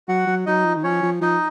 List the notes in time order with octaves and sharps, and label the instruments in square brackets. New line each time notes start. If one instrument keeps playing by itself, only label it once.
[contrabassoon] F#3 [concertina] F#4 F#5
[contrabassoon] F#3
[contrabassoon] F#3 [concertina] D#4 D#5
[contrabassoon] F3
D#3
[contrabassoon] F3 [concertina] C#4 C#5
[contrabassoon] F3
[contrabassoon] F3 [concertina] D#4 D#5